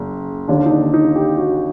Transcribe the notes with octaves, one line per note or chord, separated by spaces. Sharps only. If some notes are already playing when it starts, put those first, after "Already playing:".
Already playing: F#1
D#2 D3 D4
D#4
D4
D#4
G4
F#4